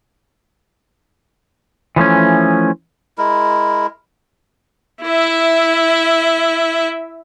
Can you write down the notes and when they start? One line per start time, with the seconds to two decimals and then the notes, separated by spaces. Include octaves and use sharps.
1.96 E3 F3 A3 C#4
3.18 G#3 E4 A#4
5.04 E4 E5